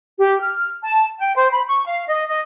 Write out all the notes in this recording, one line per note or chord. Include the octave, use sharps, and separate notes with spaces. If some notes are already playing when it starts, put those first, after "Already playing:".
G4
F6
A5
G5
C5
B5
C#6
F5
D#5
D#5